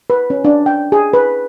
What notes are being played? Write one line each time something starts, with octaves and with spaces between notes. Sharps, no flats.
B4
C#4
D4
G5
G#4
B4